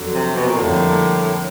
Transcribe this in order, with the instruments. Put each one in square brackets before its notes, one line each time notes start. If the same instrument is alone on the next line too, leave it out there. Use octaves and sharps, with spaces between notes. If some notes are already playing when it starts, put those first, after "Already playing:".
Already playing: [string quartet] F2 D3 F#3
[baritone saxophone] C3
B2
A#2
[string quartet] F2 D3 G3 A#3 D4 [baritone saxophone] A2